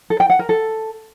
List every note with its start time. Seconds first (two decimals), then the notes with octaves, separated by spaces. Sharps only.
0.10 A4
0.20 G5
0.30 F#5
0.39 A#4
0.49 A4